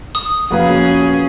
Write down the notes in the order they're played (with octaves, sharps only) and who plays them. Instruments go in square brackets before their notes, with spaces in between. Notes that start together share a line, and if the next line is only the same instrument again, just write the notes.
[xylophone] D#6
[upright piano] F2 B4 F5 [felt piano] A#3 F#4 [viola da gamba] C#4 G#4